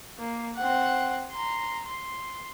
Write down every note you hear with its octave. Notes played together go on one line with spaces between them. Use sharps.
A#3
C4 F#5
A#5 C6
C6